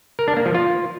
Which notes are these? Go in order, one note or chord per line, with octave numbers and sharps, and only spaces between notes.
A#4
D4
A#3
F3
F4